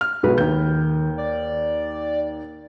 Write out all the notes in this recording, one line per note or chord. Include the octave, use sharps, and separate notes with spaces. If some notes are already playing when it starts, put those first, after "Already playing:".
F6
B1 G#3 F#4 B4
D#2 D#3 G6
D5